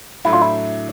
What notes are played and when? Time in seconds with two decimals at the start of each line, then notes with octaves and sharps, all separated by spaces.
0.24 A2 F#3 A3 D4 E4
0.33 F4
0.42 E4